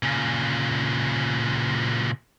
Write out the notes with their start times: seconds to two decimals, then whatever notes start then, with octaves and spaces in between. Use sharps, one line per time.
0.03 A#2 C#3